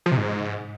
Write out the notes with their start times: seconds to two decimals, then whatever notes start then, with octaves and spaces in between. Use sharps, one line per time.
0.06 F3
0.12 C3
0.17 G#2